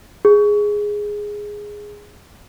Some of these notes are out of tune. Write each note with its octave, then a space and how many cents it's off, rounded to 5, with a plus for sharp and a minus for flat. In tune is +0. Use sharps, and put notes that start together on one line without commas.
G#4 +0